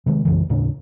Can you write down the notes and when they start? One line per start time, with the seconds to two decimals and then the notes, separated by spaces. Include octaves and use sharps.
0.06 C3 D#3 G#3
0.25 B1 F#2 C#3 E3
0.49 D#2 A2 C#3 D4